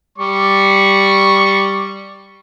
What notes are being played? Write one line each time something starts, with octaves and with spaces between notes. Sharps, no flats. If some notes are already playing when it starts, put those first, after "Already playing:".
G3 D5 C#6